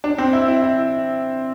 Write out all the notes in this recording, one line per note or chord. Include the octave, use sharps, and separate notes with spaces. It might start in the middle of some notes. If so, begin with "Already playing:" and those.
D4
C4
E4
E4
E4